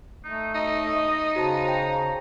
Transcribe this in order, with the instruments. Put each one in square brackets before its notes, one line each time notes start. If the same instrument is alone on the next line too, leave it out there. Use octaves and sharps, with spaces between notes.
[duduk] A3 [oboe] D#4
[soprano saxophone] D#4 [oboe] D#5
[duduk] C#3 [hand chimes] F#4 C5 A5
[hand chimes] C5 G5 [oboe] A#5